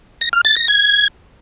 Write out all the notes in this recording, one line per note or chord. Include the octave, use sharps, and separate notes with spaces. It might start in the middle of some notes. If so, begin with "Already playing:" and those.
A#6
F6
A6
A#6
G#6